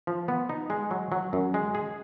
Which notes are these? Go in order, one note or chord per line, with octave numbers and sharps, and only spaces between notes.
F3
B3
D#4
G#3
F#3
F#3
F#2
G#3
G#4